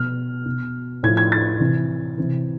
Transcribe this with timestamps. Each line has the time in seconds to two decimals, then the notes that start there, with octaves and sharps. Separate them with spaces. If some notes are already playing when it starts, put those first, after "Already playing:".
Already playing: B2 F6
0.46 B2
1.03 A2 F3 G#6
1.17 G#6
1.32 A6
1.60 C3 E3
2.18 C3 E3